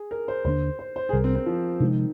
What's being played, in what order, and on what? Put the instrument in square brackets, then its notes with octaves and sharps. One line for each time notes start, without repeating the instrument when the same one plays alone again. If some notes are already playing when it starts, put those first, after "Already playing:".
Already playing: [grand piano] G#4
A#4
C5
[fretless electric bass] D#2 D3 G3 D4 [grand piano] C5
[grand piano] C5
C5
G#4
[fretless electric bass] C2 C3 G3 [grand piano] A#4
[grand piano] C4
C4
F3
[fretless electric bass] C3 F3 G#3 [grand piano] D#3